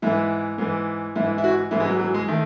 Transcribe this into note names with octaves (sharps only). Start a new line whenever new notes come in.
G#2 E3 E4
G#2 E3
G#2 E3 E4
E4
F#4
G#2 E3 E4
G#3
F#3
F#3
G#3
D#3 A3